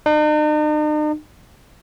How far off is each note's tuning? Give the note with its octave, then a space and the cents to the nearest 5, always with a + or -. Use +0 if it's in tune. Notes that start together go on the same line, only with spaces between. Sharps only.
D#4 -45